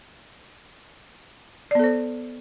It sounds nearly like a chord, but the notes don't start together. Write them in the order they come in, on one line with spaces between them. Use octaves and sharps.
D5 B3 A4 C5